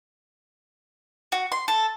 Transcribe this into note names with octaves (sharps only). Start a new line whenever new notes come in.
F#4
C6
A4